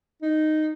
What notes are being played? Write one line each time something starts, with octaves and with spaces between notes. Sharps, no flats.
D#4